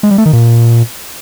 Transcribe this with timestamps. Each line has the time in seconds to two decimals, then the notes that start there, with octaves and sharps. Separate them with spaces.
0.03 G#3
0.11 G3
0.18 A3
0.26 D#3
0.33 A#2